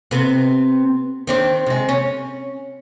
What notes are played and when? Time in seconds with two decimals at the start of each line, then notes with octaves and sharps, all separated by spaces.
0.11 C3 B3
1.27 D#3 C4 D4
1.66 C3 G#3
1.89 C#4